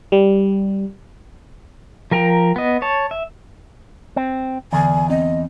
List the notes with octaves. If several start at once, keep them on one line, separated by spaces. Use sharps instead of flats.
G3
F3 A#4 G5 A#5
B3 D#5
C#5 A5
E5
C4
E2 D3 D5 G#5
C4 D#5